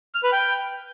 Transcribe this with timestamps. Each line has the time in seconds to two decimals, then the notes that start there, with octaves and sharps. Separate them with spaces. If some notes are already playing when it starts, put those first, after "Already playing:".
0.15 F6
0.24 B4
0.32 G5